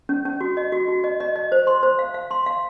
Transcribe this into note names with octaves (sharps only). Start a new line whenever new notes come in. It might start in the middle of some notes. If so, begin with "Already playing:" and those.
C#4
C#4
F#4
D#5
F#4
F#4
D#5
D#5
D#5
C5
C6
C5
F5
F5
C6
F5